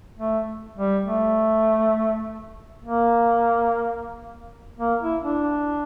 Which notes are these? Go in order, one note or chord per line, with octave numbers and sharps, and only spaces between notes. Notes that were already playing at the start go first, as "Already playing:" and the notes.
A3
G3
A3
A#3
A#3
E4
D4